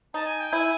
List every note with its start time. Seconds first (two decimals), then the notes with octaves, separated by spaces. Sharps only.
0.14 D#4 A5
0.26 G#5
0.40 G5
0.53 E4 G#5